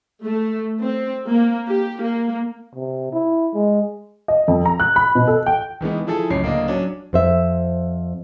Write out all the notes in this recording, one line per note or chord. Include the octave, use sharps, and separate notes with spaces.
A3
C4
A#3
G4
A#3
C3
E4
G#3
D#5
F2
A#5
F#6
B5
B2
A4
G5
D#3 E3 G#3 B3
F3 E4 G#4 A4
C#2 F#2 A2 C#5 C7
D1 A#3 D4 D#5
F#3 C#4 D4
F2 C5 E5